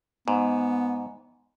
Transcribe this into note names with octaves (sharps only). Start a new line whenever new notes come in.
G#2 B3